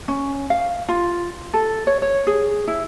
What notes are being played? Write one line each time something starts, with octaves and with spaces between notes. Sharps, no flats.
C#4
F5
F4
A4
C#5
C#5
G#4
E4